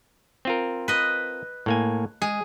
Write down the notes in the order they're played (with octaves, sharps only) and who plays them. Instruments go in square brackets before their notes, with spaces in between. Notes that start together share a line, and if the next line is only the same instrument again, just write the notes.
[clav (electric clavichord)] C4 F4 A#4
[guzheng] B4 D#5
[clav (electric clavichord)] A2 A#3 G#5
[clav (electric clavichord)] G#3 [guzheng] G#4